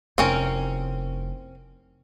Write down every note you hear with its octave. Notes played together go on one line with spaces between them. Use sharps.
F1 C4 C#4 E4 A#4